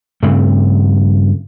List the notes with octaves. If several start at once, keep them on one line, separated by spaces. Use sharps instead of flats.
G2 C#3 A3 C4